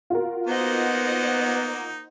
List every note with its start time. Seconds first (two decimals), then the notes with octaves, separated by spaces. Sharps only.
0.10 F4 F#4 A#4
0.47 A#3 B3 D#4 C5 D#5 F#5